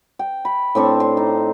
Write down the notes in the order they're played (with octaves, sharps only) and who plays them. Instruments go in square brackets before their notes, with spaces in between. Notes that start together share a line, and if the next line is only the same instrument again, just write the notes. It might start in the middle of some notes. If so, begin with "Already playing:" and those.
[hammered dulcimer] G5
B5
A2 C4 D4 C#6
C6
D#4